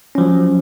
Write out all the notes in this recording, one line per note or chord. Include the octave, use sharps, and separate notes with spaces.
F3 F#3 C#4